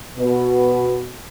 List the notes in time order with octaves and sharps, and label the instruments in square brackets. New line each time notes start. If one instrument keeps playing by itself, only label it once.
[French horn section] B2